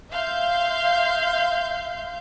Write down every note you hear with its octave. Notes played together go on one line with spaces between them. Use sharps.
E5 F5 C6 G6